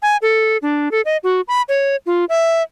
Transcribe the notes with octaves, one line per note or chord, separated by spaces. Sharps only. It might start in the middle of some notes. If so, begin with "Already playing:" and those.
G#5
A4
D4
A4
D#5
F#4
B5
C#5
F4
E5